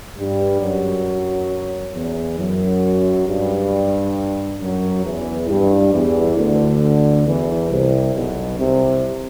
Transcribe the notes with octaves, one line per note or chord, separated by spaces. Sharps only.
G2 G3
F#2 F#3
E2 E3
F#2 F#3
G2 G3
F#2 F#3
E2 E3
G2 G3
E2 E3
D2 D3
E2 E3
C2 C3
B1 B2
C2 C3